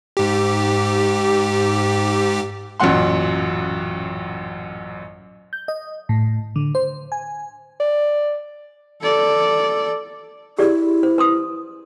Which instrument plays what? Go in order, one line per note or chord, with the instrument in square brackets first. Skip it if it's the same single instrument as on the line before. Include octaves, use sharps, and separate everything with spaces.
[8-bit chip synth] G#2 G4
[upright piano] A1 F#2 A#2 F#3 F#5 C6
[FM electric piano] G6
D#5
A2
D3
C5
G#5
[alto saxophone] D5
[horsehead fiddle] A4 D5
[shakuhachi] E4 [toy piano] G4 G#4 D5
[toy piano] C5
B4 C6 D#6